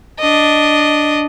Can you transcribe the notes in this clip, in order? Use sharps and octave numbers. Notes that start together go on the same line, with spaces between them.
D4 D#5